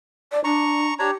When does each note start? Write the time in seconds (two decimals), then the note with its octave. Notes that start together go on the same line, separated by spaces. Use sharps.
0.32 D5
0.44 D4 A#5 C#6
0.99 D4 G4 C#5 A#5